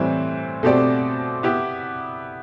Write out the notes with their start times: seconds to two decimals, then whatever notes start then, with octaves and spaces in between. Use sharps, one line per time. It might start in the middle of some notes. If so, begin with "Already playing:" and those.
Already playing: A2 E3 G3 C4
0.63 B2 A3 C4 G4 D5
1.43 B3 E4 G4